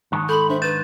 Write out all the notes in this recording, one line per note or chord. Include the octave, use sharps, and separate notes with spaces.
G#2 D#3 A5 F#6
A4 B5 C6 G6
D4 C5 E5
B4 G6 A6 E7